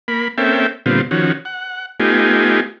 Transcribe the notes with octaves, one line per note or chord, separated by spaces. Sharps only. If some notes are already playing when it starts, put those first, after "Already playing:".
A#3 B5
A#3 C4 C#4 A4 E5 G5
A#2 D3 G3 B3 C4 F4
D#3 F3 C#4 F#4
F#5
A3 B3 D#4 F4 G4 G#5